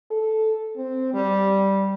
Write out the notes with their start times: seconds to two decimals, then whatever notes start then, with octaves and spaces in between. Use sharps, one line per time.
0.11 A4
0.77 C4
1.14 G3